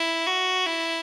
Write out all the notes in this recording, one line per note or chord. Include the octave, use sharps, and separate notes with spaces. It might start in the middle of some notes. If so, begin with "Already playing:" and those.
Already playing: E4
F#4
E4